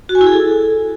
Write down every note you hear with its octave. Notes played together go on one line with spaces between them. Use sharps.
F#4
G#5
E4
G#4
A4